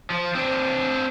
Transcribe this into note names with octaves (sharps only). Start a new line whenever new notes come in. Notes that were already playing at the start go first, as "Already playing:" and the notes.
F3
C4 D4